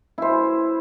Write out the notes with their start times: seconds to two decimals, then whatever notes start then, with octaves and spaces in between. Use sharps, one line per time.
0.18 E4 C5